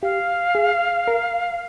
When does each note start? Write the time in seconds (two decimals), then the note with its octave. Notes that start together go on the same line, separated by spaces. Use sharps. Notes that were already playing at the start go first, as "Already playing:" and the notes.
0.02 G4 F5
0.55 G#4
1.08 A#4